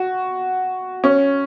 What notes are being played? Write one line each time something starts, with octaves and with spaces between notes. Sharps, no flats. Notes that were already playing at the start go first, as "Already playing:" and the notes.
Already playing: F#4
C#4